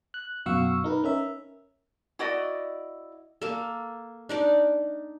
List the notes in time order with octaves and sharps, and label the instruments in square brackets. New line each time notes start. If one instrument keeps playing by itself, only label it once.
[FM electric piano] F#6
F#2 B2 F#4 F5 C#6 E6
D#4 A#4 B4
C#4 A#4 E5
[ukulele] E4 F#4 D5 D#5
[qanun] A#3 A4
D4 D#4 D5